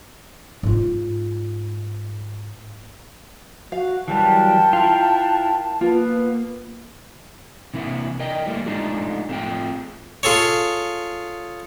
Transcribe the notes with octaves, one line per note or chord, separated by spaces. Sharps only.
G#2 F4
F#4 F5
E3 F#3 G3 A#4 F#5 G5 A5
E4 F4
A#3 B3 F4 B4
C3 E3 A#3 E4 E5 F#5
A#4 D5 D#5 G5
E3 G3 A3 A#3
G#3 A3 D4 D#4 F4 G4
A3 C4 F4 G#4 G5
F4 G#4 A4 C#5